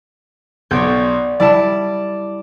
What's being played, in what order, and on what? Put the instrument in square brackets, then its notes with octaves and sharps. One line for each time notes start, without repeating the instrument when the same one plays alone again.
[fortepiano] B1 [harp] C#5 D5 G6
[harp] G3 E4 [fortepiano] D5 A5